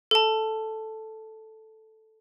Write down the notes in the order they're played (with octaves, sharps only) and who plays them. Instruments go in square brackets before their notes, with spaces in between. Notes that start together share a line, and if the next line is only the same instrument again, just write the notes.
[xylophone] A4 A5